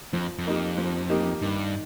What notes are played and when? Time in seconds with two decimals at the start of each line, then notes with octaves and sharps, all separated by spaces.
0.13 F2 F3
0.38 F2
0.45 A#3 D#4 G4
0.78 F3
1.09 A#3 D#4 G4
1.42 G2 D#3